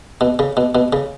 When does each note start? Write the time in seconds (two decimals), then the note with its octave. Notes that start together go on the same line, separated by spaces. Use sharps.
0.21 B2
0.39 C#3
0.57 B2
0.75 B2
0.93 C#3